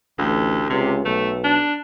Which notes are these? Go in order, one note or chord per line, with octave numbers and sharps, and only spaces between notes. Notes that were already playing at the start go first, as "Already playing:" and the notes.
A1 D2
C#2 C3
B1 A3
D4